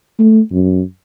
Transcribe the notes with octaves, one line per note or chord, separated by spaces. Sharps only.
A3
F#2